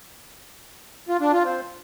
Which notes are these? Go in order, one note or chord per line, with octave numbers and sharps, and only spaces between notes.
F4
D4
F4
C4